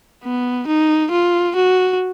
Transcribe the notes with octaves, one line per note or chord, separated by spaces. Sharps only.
B3
D#4
F4
F#4